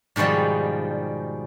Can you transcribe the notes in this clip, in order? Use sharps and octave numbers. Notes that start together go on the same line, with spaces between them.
G#2 B2 D#3 F3 G3